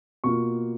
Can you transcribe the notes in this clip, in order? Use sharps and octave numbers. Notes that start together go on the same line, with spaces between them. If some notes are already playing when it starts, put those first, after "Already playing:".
B2 A#3 F4 C#6